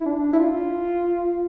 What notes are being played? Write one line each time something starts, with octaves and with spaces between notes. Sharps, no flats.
E4
D4
E4
F4